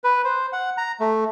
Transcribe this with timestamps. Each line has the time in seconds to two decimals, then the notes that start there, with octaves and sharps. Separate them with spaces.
0.04 B4
0.25 C5
0.53 F#5
0.78 A#5
1.00 A3